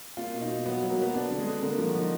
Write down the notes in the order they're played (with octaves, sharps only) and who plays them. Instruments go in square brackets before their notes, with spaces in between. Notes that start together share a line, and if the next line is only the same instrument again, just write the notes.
[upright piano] A#3 [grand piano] F4
[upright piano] B2
[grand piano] D#4
[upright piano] B2
[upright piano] F#3 [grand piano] B3
[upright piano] F#3
[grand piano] A#3
[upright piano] F#3 [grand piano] B3
[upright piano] B3 [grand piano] D4
[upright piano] D3
[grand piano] G#3
[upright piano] D3
[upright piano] D3 [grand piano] A#3
[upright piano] F3 [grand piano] A#3
[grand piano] F#4
[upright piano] F3 [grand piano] D#4